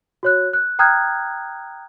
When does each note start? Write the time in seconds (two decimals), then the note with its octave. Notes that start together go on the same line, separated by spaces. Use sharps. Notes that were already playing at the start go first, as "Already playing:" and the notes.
0.23 F#4 C#5 F#6
0.53 F#6
0.79 G5 A#5 D#6 F6 F#6 G#6